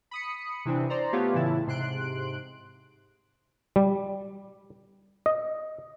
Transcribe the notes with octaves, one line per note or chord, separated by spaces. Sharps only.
B5 D#6 C#7
C3 E3 C4 D4
C5 D5 A#5
A3 B3 F4 G4 C#5
A2 C#3 E3 E4 A5
G#2 C3 C6 F#6 D7
G3
D#5